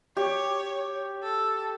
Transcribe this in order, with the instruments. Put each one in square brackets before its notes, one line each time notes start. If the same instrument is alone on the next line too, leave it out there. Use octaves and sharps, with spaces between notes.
[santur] G4 [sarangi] C#5
[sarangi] A4